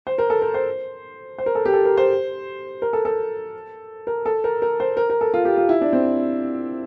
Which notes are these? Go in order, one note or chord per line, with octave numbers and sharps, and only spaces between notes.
C5
A#4
A4
A#4
C5
C5
A#4
A4
G4
A4
A#4
C5
A#4
A4
A4
A#4
A4
A#4
A#4
C5
A#4
A#4
A4
F4
G4
F4
E4
D4
C4